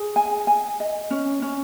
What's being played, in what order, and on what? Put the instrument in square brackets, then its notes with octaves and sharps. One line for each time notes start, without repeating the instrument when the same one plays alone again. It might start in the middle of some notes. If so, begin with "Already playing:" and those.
Already playing: [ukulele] G#4
G#5
G#5
D#5
C#4
C#4